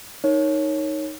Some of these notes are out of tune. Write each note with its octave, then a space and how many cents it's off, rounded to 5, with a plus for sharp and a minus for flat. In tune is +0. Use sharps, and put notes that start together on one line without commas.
D#4 +0 A#4 +0 C#5 +0